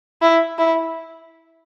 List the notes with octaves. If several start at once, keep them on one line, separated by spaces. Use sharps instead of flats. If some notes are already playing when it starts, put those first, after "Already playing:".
E4
E4